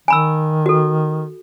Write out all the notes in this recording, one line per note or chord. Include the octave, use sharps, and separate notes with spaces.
D#3 G#5 B5 E6
F#4 A4